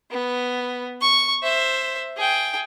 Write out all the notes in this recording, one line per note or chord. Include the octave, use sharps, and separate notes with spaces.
B3
C#6
C5 E5
G#4 G5